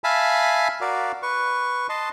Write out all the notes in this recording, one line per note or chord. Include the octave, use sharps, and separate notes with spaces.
E5 F5 G#5 A5 B5
F#4 A#4 D5 F5
B4 C#6
D#5 A5 C6